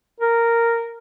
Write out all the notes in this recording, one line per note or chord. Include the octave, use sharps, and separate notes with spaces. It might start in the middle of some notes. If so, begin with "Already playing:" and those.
A#4